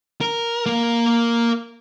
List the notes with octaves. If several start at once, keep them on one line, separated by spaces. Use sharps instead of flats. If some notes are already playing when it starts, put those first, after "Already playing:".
A#4
A#3 A#4